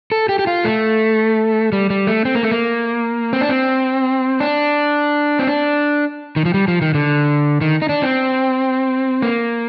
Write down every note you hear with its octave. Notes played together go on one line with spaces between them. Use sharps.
A4
G4
G4
F4
A3
G3
G3
A3
C4
A#3
A3
A#3
C4
D4
C4
D4
C4
D4
D#3
F3
G3
F3
D#3
D3
D#3
D#4
D4
C4
A#3